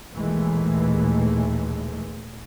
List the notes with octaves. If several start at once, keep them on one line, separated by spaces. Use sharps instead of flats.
A#1 D#2 B2 E3 G#3 A3